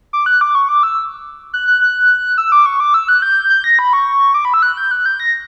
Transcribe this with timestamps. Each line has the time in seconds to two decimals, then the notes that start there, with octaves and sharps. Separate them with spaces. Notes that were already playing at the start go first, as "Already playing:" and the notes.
0.13 D6
0.26 F#6
0.41 D6
0.55 C#6
0.69 D6
0.83 E6
1.54 F#6
1.68 F#6
1.81 F#6
2.38 E6
2.52 D6
2.66 C#6
2.80 D6
2.94 E6
3.09 F#6
3.22 G6
3.50 G6
3.64 A#6
3.79 B5
3.93 C#6
4.34 D6
4.45 B5
4.54 E6
4.63 F#6
4.77 G6
4.91 F#6
5.06 G6
5.20 A#6